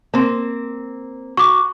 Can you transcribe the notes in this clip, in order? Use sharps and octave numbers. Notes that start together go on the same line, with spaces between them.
A#3 C4
F#4 C#6 D6